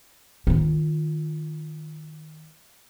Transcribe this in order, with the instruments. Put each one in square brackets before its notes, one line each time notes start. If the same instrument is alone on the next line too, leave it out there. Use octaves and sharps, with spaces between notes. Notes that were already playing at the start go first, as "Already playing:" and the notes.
[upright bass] D#3 F4